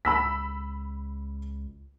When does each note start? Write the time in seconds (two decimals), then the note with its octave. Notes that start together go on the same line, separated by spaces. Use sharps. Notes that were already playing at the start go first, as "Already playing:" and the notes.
0.05 C#2 B5 E6 B6